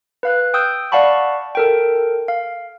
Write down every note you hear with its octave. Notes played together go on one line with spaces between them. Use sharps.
B4 F5 F#6
G5 D#6 E6 G6
D5 F5 F#5 A5 B5 C#6
A4 A#4 G5
F5